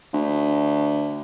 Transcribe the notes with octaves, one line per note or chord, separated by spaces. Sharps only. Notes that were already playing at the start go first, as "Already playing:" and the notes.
D2